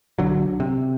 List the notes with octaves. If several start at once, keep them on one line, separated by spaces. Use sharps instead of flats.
B1 D3 F#3
C3